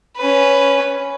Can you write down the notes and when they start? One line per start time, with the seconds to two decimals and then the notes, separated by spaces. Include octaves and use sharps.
0.17 C#4 B4